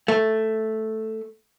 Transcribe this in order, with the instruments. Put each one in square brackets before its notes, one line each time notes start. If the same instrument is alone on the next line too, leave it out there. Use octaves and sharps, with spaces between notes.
[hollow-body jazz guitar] A3